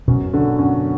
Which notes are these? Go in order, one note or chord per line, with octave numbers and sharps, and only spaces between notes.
F#2 B2
D3
F#2